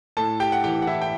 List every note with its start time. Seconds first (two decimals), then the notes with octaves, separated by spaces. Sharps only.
0.17 A2 A4 A5
0.40 G4 G5
0.52 F#5
0.64 E3 G4 G5
0.82 F#5
0.87 E4 E5
1.02 G5